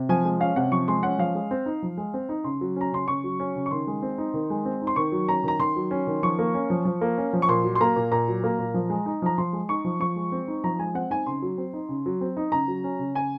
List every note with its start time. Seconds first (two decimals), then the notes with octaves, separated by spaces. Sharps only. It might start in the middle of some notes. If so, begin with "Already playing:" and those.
Already playing: C3
0.09 F3 G#5
0.25 G#3
0.40 C#4 F5
0.56 C3 F#5
0.72 F3 C#6
0.88 G#3 C6
1.03 C#4 F#5
1.18 F3 F5
1.35 G#3
1.51 C4
1.66 D#4
1.83 F3
1.97 G#3
2.14 C4
2.29 D#4
2.44 C#3 C6
2.61 F#3
2.76 C#4 A#5
2.92 C#3 C6
3.08 C#3 C#6
3.24 F#3
3.40 C#4
3.56 C#3
3.66 C#6
3.71 D#3 C6
3.87 G#3
4.02 C4
4.18 D#4
4.34 D#3
4.50 G#3
4.65 C4
4.82 D#4
4.87 C6
4.96 D#3 C#6
5.12 F#3
5.28 C#4 A#5
5.44 D#3 A#5
5.59 D#3 C6
5.76 F#3
5.91 C#4
6.07 D#3
6.23 F3 C#6
6.39 A#3
6.54 C#4
6.70 F3
6.85 F3
7.01 A#3
7.18 C#4
7.33 F3
7.42 C#6
7.48 A#2 C6
7.64 F#3
7.75 C6
7.81 A#3 A#5
7.96 A#2
8.11 A#2 A#5
8.28 F#3
8.44 A#3
8.59 A#2
8.74 F3
8.90 G#3
9.06 D#4
9.22 F3 A#5
9.38 F3 C6
9.53 G#3
9.69 D#4 C#6
9.85 F3
10.00 F3 C#6
10.16 G#3
10.32 C4
10.48 D#4
10.64 F3 A#5
10.79 G#3 G#5
10.94 C4 F#5
11.10 D#4 G#5
11.26 C#3 C6
11.42 F#3
11.58 C4
11.73 D#4
11.89 C#3
12.06 F#3
12.21 C4
12.37 D#4
12.52 C#3 A#5
12.68 F#3
12.84 C#4
12.99 C#3
13.15 C#3 G#5